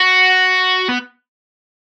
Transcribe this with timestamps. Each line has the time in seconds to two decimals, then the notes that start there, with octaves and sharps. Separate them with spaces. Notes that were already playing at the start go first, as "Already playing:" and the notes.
Already playing: F#4
0.89 B3